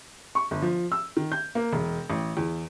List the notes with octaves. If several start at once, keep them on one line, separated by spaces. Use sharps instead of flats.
C#6
G1
F3
E6
D#3
G6
A#3
E1
A1
E2